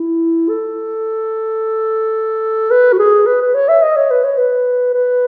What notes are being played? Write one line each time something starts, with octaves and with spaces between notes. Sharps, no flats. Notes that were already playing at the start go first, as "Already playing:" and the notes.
Already playing: E4
A4
B4
F#4
G#4
B4
B4
C#5
E5
D#5
C#5
B4
C#5
B4
B4